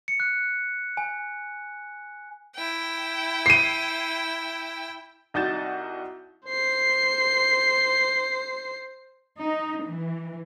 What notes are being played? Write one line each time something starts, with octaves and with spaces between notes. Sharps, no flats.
C#7
F#6
G#5
E4 G5
C7 D#7
C2 D#4 F#4 G6 A6 E7
C5 C7
D#4
E3